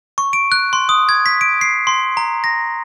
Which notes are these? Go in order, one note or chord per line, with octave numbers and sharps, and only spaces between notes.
C#6
D7
F#6
C6
D#6
G#6
B6
D7
C7
C6
A#5
A#6